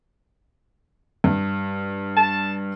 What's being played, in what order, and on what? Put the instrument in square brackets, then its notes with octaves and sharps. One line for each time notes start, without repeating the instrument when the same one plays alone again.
[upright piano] G2
[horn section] A5